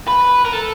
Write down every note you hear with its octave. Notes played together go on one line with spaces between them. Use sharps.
B4
A#4
A4